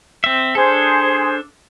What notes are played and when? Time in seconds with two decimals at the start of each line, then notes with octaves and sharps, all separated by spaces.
0.24 C4 E5
0.55 D4 G#4 A4 C5